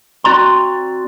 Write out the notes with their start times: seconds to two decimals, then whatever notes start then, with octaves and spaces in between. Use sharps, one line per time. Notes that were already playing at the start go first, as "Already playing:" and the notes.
0.24 C4 F#4 D5 A#5 C6